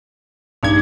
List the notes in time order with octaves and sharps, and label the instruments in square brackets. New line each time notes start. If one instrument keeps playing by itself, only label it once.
[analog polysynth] A#1 G2 G#6 [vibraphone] A#3 D4 D#4